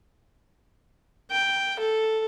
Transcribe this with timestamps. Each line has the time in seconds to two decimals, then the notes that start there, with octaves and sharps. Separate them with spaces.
1.31 G5
1.80 A4